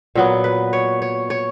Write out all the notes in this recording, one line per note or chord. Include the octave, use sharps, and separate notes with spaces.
A#2 F#3 B3
B4
C#5
C#5
C#5